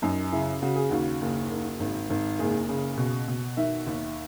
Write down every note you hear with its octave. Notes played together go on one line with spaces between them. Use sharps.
F#2 D#4
C#3 E4
C#3 F#4
G#4
D#2 F#4
F#1
F#1
G#1
G#1
F#1 G#4
C#3
B2
B2
D#3 E5
D#2